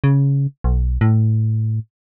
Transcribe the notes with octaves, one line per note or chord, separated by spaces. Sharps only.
C#3
B1
A2